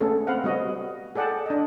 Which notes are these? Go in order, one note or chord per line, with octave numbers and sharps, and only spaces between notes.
A3 B3 C#4 G#4 A4
C4 B4 F5 F#5
G3 B3 F#4 D#5
G#4 A4 D5 F#5 G5 A5
D4 D#5